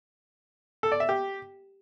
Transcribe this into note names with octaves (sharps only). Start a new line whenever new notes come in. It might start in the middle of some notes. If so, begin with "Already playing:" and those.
A4
D5
E5
G4